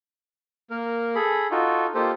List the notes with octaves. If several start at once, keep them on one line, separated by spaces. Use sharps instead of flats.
A#3 A#4
G#4 A4 B5
D#4 F4 F#4 A4
A#3 D#4 F4 G4 A4 C5